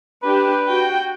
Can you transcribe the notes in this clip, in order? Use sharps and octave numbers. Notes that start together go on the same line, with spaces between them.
D4 G4 B4
F#4 G5